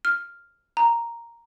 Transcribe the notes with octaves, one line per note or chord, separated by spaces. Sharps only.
F6
A#5